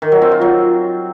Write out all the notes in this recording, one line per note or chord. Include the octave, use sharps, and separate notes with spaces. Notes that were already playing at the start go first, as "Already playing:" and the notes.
D#3
F#3
C4
F4
F#3